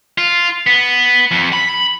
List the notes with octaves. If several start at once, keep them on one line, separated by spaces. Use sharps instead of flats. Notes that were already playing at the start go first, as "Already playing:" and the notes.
F4
B3
F2
B5